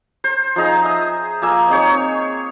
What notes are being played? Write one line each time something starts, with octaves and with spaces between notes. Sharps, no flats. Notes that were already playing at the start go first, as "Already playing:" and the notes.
C5
F3 D#4 G#4 A#5
E5 D#6
F3 A#3 G#5 E6
C4 D#4 G#4 C#5